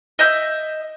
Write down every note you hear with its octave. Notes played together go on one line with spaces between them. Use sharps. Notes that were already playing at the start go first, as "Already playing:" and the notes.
D#5 E5 G6